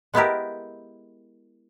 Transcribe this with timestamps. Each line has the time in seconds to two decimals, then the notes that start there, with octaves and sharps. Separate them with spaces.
0.14 G#3 B3 E4 G4 A#4